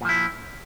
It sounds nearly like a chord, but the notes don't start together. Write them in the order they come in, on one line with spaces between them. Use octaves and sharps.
A#2 F3 E4